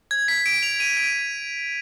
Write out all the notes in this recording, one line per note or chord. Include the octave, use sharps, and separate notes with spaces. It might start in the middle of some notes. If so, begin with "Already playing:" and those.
G#6
B6
D7
F7
D#7
D7